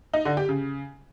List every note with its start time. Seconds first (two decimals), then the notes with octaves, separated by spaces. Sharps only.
0.14 D#4
0.25 D3
0.37 G4
0.49 C#3